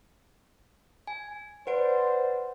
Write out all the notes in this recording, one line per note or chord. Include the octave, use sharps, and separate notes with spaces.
G#5
B4 C5 D5 F#5 D7